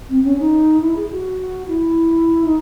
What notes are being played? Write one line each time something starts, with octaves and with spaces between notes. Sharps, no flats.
C4
C#4
D#4
E4
G#4
F#4
E4
D#4